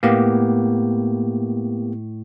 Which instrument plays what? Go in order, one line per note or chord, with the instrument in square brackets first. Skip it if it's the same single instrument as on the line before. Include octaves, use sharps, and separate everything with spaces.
[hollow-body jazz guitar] A2 F5 [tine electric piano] A#3 B3 G4